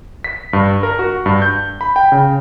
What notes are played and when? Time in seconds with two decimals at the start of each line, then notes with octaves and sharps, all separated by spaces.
0.24 B6
0.53 G2
0.83 A#4
0.99 F#4
1.26 G2
1.42 G6
1.81 B5
1.96 G5
2.12 C#3